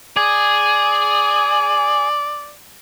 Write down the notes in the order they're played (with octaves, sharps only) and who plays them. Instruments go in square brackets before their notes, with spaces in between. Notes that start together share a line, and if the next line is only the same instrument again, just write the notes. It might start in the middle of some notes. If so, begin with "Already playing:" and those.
[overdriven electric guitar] G#4 [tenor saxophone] D5